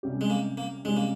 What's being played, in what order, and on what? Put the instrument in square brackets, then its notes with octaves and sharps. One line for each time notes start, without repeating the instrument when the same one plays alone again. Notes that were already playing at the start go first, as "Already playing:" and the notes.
[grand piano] C3 G3 C#4 G4
[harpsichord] G#3
A#3
A#3
[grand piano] C3 G3 C#4 G4 [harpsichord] G#3
[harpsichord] A#3